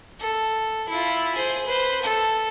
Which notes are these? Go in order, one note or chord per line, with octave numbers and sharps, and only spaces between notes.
A4
E4 F4
G#4 C5
B4 C5
A4